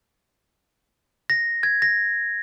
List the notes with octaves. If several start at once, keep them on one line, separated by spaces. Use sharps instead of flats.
A#6
G#6
A#6